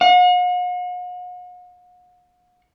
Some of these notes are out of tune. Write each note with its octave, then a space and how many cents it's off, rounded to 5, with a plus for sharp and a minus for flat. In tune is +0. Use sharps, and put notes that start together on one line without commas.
F#5 -45